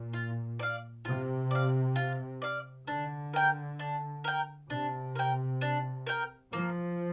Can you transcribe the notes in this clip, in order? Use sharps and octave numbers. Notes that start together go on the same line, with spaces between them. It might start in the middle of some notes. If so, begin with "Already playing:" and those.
Already playing: A#2
F4
D5 F5
C3 F4
D5 F5
F4
D5 F5
D3 D4
A#4 G5
D4
A#4 G5
C3 D4
A#4 G5
D4
A#4 G5
F3 A#3